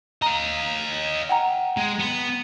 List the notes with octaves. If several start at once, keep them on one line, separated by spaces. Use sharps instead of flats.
D#5 F5 A#5
F#5 G5 A#5
G#3
B3